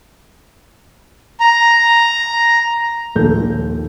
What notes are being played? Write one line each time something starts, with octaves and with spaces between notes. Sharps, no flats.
A#5
A#1 D#2 A4 G6